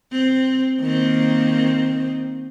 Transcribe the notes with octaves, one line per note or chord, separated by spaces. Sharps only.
C4
D#3 A#3 C4